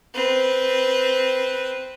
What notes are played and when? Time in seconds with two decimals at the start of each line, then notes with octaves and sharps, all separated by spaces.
0.15 C4 B4